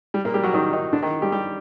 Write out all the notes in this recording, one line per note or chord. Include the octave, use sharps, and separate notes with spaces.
G3
A#2 A#3
G3 G4
F#3 F#4
D#3 D#4
D#3 D#4
D3 D4
D#3 D#4
G3 G4
G3 G4